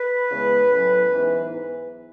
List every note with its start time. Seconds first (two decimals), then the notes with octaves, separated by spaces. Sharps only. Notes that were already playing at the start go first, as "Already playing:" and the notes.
Already playing: B4
0.29 E2 C#3 G#3 B3
0.71 A2 F#3 C#4
1.13 G#2 E3 B3 D#4